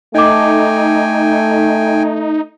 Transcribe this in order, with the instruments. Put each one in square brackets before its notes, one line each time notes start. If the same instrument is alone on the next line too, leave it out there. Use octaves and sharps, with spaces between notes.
[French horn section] A3 [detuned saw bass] D#4 [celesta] D#5 D6 [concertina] G5 G#5